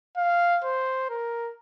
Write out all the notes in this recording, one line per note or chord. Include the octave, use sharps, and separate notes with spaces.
F5
C5
A#4